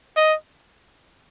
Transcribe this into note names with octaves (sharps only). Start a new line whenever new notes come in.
D#5